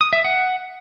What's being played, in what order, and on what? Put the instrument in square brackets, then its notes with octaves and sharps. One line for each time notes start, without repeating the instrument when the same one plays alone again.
[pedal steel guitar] D#6
E5
F#5